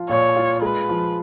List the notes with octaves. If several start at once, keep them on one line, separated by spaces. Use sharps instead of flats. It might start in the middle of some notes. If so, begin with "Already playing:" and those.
Already playing: F3 F4
A#2 C#5
F4
G#3 B4
F3